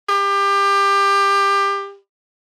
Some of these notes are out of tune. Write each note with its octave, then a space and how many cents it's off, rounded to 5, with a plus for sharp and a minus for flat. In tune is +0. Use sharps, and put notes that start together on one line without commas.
G4 +25